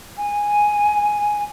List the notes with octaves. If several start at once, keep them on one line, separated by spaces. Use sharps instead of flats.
G#5